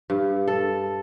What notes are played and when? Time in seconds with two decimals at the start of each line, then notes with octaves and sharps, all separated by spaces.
0.10 G2
0.48 A4